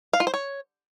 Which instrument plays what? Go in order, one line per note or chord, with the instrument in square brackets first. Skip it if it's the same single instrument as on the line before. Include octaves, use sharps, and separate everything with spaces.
[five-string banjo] F5
F4
C5
C#5